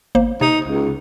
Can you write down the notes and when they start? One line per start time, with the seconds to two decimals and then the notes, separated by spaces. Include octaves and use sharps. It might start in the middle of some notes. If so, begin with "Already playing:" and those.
0.15 G#1 A#3 C5
0.41 C3 D#4
0.65 C#2